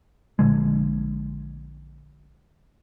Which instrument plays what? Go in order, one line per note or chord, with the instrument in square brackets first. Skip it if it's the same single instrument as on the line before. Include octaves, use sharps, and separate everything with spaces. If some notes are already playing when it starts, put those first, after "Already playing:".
[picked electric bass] A#1 D3 G#3